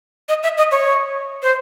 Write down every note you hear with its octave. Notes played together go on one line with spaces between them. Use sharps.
D#5
E5
D#5
C#5
C5